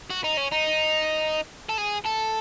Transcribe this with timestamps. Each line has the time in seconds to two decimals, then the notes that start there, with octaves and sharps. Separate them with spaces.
0.10 F#4
0.24 D#4
0.37 C#4
0.52 D#4
1.69 A4
1.78 G#4
2.06 A4